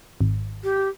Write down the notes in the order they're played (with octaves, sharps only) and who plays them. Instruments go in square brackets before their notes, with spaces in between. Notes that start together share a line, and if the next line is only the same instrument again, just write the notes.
[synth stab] G#1
[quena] G4